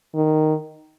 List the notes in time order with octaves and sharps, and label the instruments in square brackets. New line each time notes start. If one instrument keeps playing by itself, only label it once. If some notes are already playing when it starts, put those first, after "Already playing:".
[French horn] D#3